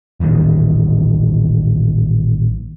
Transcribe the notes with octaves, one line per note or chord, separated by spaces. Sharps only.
D#1 A1 D#2 D#3